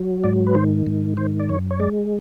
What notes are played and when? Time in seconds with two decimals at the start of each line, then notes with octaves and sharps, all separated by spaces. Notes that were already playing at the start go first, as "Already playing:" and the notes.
Already playing: F#3
0.24 G#2 D5
0.47 B4
0.55 D#3 C5
0.87 G#2
1.17 D#3 C5
1.40 D5
1.49 F#2 C#5
1.71 C#5
1.80 G#3 D5